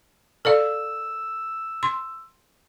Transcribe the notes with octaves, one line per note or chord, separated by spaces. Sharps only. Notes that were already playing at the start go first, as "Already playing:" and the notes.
A4 D5 F5 E6
C6